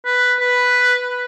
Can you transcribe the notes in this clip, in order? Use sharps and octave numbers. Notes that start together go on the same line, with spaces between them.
B4
B4